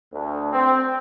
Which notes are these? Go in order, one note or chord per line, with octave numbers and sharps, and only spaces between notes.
D2
C4